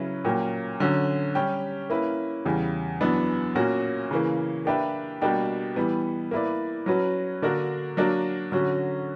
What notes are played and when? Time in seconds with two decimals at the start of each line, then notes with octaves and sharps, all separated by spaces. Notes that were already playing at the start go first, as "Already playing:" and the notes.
Already playing: C#3 F#3 C#4 E4 B4
0.25 A#2 F#3 A#3 C#4 G4
0.80 D3 F#3 C#4
1.35 G3 C#4 G4
1.90 A#3 C#4 E4 B4
2.45 E2 C#3 G3
3.01 F#2 E3 B3 D4
3.55 A#2 A#3 C#4 F#4 A#4
4.11 C#3 E3 A#3
4.65 A#3 D4 G4 B4 E5
5.21 B2 G3 A#3 D4 G4
5.76 E3 G3 B3
6.31 A#3 E4 B4 D5
6.86 F#3 C#4 F#4 B4
7.42 D3 A#3 D4 F#4 A#4
7.97 F#3 A#3 D4 F#4 A#4
8.52 D3 F#3 C#4 F#4